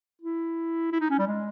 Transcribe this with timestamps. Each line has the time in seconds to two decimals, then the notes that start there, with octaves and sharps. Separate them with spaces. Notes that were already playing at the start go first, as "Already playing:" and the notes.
0.22 E4
0.92 E4
1.00 D#4
1.10 C#4
1.19 G3
1.27 G#3